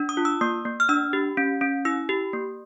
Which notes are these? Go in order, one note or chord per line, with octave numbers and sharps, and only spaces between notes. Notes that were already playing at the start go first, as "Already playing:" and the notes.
Already playing: D4
D#6
F4
E6
A#3 D#6
A#3
F6
D4 E6
G4
C#4
C#4
E4 E6
G4
A#3